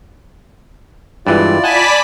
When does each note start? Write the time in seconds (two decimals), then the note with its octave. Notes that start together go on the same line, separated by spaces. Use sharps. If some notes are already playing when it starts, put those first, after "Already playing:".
1.27 G2 E3 G#3 E4 F4 D5
1.64 D5 D#5 F#5 G#5 A5 B5 B6